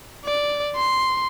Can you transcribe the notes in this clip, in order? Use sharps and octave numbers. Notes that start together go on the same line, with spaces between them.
D5
C6